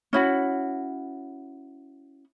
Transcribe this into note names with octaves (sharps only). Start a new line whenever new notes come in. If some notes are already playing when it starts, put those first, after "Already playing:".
C#4 E4 F#4